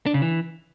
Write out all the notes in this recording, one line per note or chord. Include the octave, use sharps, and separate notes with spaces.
D4
C#3
E3